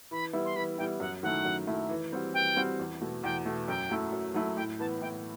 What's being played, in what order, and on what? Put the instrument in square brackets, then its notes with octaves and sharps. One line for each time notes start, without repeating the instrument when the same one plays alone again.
[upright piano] E3 [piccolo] B5
[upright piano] G3 B3 E4
[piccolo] C6
[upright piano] E3 [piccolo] B5
[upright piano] G3 B3 E4 [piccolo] G5
[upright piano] F#2 [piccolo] F#5
[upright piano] D#3 F#3 A3 E4 [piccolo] F#5
[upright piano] F#2
D#3 F#3 A3 E4
E3
G3 C4 F#4
[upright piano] E3 [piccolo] G5
[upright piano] G3 C4 F#4
E2
B2 A3
[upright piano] E2 [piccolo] G5
[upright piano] B2 A3
[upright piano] F#2 [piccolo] G5
[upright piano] F#3 A3 E4
F#2
F#3 A3 E4
[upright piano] A2 [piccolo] G5
[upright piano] E3 B3 [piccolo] A5
[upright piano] A2 [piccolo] G5